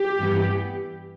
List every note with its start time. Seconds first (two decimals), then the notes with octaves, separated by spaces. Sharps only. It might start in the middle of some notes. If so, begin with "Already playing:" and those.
Already playing: G4
0.18 G2 E3 B3